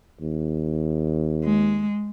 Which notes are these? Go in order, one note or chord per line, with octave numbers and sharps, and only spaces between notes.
D#2
G#3